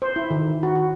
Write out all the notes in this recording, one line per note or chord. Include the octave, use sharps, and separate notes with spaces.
C5
E4
D#3
F#4
F#4